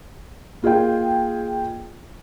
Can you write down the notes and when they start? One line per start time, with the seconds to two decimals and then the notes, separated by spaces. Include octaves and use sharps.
0.63 A#3 F4 G#4 D#5 G5